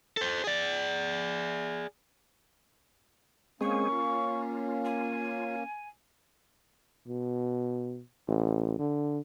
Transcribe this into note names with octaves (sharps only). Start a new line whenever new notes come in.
A4 C5
G#4 D5
G#3 A#3 C4 C#4 G#4 C#6
F4
G#5
B2
A1
D3